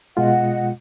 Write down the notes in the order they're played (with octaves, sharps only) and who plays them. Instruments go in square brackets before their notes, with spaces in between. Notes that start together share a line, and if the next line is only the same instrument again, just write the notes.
[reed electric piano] B2 G#3 F4 [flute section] D#5 F#5